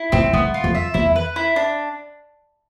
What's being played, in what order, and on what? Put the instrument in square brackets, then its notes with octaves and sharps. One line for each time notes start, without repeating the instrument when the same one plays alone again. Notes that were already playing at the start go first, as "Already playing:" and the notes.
Already playing: [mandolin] E4
[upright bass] G#2 [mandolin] C4
[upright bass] G#2 [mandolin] B3
[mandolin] F4
[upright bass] F2
[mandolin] E5
[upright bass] E2 [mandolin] E4
[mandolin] B4
E4
D4